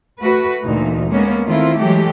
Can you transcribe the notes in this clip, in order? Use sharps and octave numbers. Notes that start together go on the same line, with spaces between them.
A3 F#4 B4
D2 A#2 E3 D#4
G#3 A#3 B3 C#4
D#3 A3 C4 E4 F4
E3 F#3 G#3 A3 G4